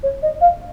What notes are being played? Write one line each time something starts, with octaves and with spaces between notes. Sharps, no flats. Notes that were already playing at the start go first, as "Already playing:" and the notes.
C#5
D#5
F5